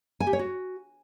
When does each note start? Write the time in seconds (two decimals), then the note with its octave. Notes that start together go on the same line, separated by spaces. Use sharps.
0.20 G#5
0.27 G4
0.33 C#5
0.39 F#4